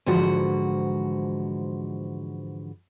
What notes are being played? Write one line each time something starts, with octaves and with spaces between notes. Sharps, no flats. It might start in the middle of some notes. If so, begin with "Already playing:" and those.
G#2 D3 E3 F3 F#4